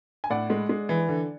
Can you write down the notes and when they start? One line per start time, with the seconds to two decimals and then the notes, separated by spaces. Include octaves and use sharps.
0.24 G#5
0.30 A2 D5 F#5
0.50 G#3
0.69 G#3
0.89 E3
1.09 D3